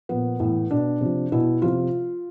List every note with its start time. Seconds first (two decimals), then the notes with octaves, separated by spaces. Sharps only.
0.09 A#2 F3 B3
0.40 A2 E3
0.71 B2 D4
1.01 C3 F3
1.32 B2 E4
1.62 C3 F3 F4